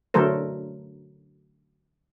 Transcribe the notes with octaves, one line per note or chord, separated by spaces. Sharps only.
D3 F#3 A3 A4 A#4 C5